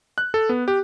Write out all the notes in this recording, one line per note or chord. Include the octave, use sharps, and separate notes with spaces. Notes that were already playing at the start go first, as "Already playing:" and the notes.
F#6
A4
B3
G4